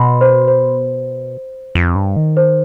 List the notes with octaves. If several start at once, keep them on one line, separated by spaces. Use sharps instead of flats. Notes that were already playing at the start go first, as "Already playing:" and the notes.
Already playing: B2 B5 C6
C5
C5
F2
G2
D#3
C5